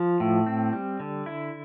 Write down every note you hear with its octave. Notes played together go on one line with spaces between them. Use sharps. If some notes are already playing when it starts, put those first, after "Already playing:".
Already playing: F3
A2
C4
G3
D3
E4